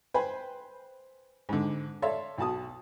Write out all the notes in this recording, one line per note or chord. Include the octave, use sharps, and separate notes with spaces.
B4 C5 G5 G#5 B5
G#2 D3
A4 C#5 D5 E5 F5 C6
B1 F#4 A5 D#6